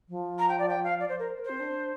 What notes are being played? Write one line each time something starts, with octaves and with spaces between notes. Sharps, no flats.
F3
A#5
G5
D5
G5
F5
D5
C5
A#4
C5
A#4
C4 C5
D4